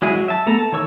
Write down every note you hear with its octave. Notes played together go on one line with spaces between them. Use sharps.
F#3 G#3 E4 G#4
F#3
E5 A5
A3 B3 A4 A#5
A5
D#3 E3 C#5 C#6 E6